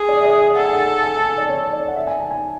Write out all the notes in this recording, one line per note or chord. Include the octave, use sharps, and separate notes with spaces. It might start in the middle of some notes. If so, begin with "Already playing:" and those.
Already playing: G#4
D5
E5
D5
E5
A4 F#5
G#5
F#5
G#5
A5
G#5
D5
C#5
D5
F#5
E5
G#5
A5
G#5